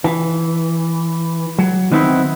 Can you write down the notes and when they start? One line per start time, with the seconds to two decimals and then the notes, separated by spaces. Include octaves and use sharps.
0.04 E3
1.59 F#3
1.92 D#3 B3 C4 D#4 E4